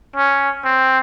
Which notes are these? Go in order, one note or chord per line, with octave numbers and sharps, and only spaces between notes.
C#4
C4